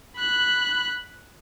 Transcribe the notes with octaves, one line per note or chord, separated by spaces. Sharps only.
B5 F#6